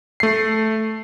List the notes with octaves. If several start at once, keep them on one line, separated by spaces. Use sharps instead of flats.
A3 C7